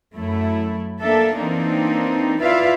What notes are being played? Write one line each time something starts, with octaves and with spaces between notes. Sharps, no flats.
F#2 A3 E4
A#3 D4 A4 E5
E3 A#3 C4 D4 D#4
E4 F4 B4 D5 E5 F5